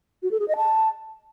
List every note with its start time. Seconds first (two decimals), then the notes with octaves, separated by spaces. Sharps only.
0.23 F#4
0.31 A4
0.40 G#4
0.48 D#5
0.57 A5